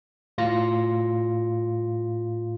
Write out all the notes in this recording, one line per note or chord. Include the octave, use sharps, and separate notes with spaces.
A2 F4 A#6